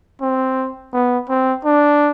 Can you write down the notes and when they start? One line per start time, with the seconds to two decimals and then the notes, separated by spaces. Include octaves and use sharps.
0.21 C4
0.93 B3
1.29 C4
1.64 D4